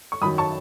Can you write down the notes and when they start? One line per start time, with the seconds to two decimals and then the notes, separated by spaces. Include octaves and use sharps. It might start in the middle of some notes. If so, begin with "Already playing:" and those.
0.12 C#6
0.21 F#2 D#3 F#3 B5 D#6
0.38 A5 C#6